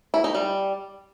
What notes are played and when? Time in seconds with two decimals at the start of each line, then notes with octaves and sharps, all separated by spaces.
0.14 E4
0.24 D#4
0.35 G3